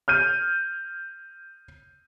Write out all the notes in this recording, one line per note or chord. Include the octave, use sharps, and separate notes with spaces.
F6 G6 D#7